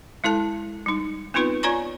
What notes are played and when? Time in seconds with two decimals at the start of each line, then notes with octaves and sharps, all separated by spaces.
0.24 G#3 E4 A4 A5
0.86 G3 D#4
1.34 B3 C4 D#4 F4 B4
1.63 F4 C#5 D5 G#5 A#5 C#6